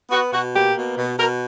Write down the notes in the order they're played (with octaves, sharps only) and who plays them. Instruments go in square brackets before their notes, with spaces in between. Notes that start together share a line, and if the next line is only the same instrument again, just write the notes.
[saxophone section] B3 F#4
B2 F#4
A#3 G4
B2
B2
B2 A#4